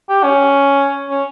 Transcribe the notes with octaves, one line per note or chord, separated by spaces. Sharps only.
G4
C#4
C#4